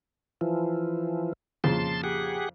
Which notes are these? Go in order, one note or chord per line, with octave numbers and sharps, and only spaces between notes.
E3 F3
F2 A#2 C#3 A5 C6
G4 G#4 F#5